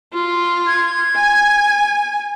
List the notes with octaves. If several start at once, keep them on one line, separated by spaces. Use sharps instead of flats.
F4
G#6
G#5